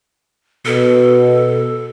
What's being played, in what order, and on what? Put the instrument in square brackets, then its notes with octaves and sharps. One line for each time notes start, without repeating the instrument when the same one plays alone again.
[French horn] B2 [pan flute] A4